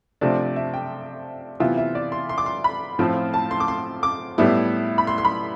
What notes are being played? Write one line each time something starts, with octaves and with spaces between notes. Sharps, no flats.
C3 F3 A3 D4 D5
E5
G5
C3 E3 B3 F4 E5
E5
D5
C6
C6
D6
C6
B5
A2 F3 C4 F4
A5
C6
D6
C6
D6
A2 G3 B3 E4
B5
C6
C6
B5